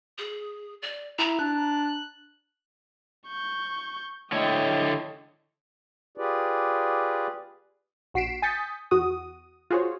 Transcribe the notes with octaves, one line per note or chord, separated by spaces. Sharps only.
G#4
D5
E4 A#5
D4 F#6
C#6 G6
D3 E4 C#5 D#5 G5
F4 G4 G#4 B4 D5
A#1 F#4 B6 C7 D7 E7
G#5 D#6 G6 A6 B6 C#7
E2 F#4 D#6
F4 F#4 G#4 C5 C#5